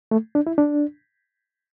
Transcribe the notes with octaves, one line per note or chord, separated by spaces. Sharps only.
A3
D4
E4
D4